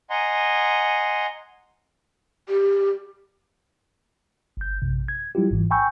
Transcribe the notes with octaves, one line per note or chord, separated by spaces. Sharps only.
D#5 F#5 G#5 A#5 C6
G4
G1 G6
A1 F#2 C3
G#6
F#3 G3 E4 F4 G4
G#1 G#2 E3
G5 G#5 B5 C#6 E6 G6